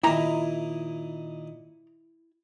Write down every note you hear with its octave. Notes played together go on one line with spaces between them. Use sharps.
A#2 D#3 D#4 E4 G4 A#5